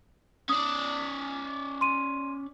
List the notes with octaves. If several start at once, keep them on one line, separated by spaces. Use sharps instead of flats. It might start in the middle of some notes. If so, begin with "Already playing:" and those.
C#4 D5 D#6
C6 D#7